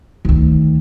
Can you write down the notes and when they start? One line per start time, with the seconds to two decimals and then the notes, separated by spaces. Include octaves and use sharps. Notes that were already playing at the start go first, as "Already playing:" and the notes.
0.25 D2 D#3